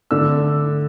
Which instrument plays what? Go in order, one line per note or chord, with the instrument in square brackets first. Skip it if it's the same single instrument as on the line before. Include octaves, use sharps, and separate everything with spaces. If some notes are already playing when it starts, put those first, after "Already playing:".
[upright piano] D3 A3 D4 E6